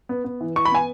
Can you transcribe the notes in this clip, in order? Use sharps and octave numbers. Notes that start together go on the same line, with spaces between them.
B3
B3
E3
E3 C#6
B5
B3 G#5